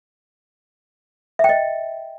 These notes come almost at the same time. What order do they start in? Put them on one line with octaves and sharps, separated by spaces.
E5 G5 D#5